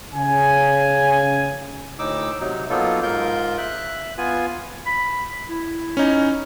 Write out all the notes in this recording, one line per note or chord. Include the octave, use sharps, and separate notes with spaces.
C#3 G#5
D2 A2 D#4 D6 E6
C3 F#3 D#4
F#3 A#3 B3 D#4 F4 A4
G#2 F4 A#4 G6
E5 F#6
B3 F4 G#5
B5
E4
C#4 D#4